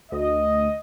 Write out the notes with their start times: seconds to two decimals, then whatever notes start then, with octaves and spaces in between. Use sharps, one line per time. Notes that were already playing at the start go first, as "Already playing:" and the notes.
0.12 D2 D#5